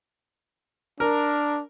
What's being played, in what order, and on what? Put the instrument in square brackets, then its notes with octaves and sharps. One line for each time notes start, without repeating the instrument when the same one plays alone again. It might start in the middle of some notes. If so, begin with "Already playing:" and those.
[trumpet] D4 [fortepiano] A#4